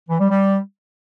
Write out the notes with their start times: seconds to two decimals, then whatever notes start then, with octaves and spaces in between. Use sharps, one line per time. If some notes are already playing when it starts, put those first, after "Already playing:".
0.09 E3
0.19 G3
0.29 G3